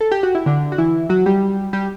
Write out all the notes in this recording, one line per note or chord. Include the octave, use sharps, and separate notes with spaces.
A4
G4
F#4
E4
D3 D4
F#4
E3 E4
F#3 F#4
G3 G4
G3 G4